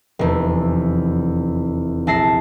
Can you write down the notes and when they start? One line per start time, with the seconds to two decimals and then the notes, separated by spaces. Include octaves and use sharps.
0.19 F1 E2
2.07 A#1 E4 A5 A#6 C7